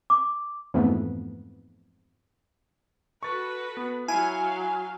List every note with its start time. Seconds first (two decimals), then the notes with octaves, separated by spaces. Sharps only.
0.10 D6
0.74 F2 G#2 E3 A3 B3
3.23 F#4 A4 B4 C#6 A6
3.77 B3
4.08 F#3 E4 F5 G#5